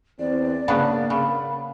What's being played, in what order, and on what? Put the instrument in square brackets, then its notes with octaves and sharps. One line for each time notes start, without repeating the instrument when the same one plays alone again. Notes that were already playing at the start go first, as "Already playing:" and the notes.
[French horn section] E2 C4 [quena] D5
[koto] C#3 B3 D4 [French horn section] A#3
[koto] C#3 [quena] B5